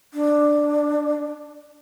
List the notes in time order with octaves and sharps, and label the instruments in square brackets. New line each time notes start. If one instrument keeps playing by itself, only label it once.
[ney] D4